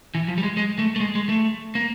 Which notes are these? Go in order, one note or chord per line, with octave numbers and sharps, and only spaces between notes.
E3
F3
G3
G#3
G#3
A3
A3
G#3
G#3
A3
A#3